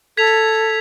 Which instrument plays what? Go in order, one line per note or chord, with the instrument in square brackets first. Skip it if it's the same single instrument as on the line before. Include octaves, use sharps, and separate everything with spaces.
[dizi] A4 [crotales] G#6 B6 F7